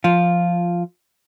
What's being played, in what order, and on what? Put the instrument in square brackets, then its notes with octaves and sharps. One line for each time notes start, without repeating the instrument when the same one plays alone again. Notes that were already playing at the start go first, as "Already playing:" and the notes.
[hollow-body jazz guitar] F3 F4